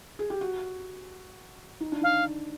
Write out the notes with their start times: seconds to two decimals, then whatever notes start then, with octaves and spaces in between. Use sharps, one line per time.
0.19 G#4
0.30 G4
0.41 F#4
1.80 D#4
1.92 D4
2.02 D#4 F5